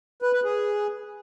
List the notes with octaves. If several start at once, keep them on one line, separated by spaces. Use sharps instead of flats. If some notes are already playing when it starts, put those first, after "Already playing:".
B4
B4
G#4